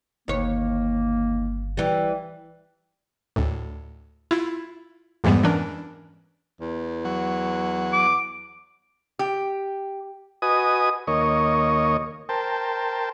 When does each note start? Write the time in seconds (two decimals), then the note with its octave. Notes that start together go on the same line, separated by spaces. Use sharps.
0.28 G1 D#2 A#3 C#5
1.77 E3 G3
3.36 D2 A2
4.31 E4 F4
5.24 F2 G#2 E3 G3 G#3 B3
5.43 E3 C#4 D4 A#4
6.61 E2
7.05 F#3
7.93 D6
9.19 G4
10.42 F#4 B4 D#5 G#5 D#6
11.07 D#2 A#3 C#5 D#5
12.29 A#4 C5 G5 A5